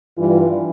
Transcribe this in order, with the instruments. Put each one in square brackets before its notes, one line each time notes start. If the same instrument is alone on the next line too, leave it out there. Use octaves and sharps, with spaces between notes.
[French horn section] G2 E3 G3 D4 F4